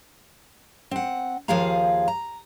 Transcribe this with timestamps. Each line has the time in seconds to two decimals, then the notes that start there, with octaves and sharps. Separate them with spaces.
0.91 C4 F#5
1.48 D#2 F3 F4 G#4 F5 A#5
2.08 A#5